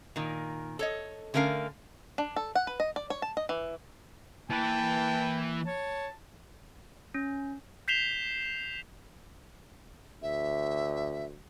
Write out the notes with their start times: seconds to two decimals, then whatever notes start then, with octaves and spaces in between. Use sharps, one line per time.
0.16 A#2 D#3
0.79 A4 C#5 D#5
1.34 D3 A3 C#4 A#4 F5
2.18 D4
2.36 A4
2.55 F#5
2.67 B4
2.80 D#5
2.96 D5
3.10 C#5
3.22 A5
3.37 D#5
3.49 E3
4.50 E3 A#3 B4 G5 A5
5.66 C#5 A5
7.15 C#4
7.88 G6 B6 C7 E7 F7 G7
10.22 D2 E5